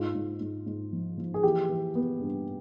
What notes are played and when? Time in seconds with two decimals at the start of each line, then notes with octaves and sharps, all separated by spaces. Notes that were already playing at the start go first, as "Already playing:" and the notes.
Already playing: G#2 F4
0.15 G#2
0.40 G#2
0.66 G#2
0.93 F3
1.18 F3
1.34 G#4
1.43 E3 G4
1.69 E3
1.95 B3
2.21 G2